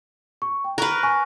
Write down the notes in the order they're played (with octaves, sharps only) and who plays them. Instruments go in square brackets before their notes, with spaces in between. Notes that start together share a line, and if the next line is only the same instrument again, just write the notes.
[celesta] C#6
G5
[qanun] A#4 B4 [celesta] C#6 F#6
[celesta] G#5 C#6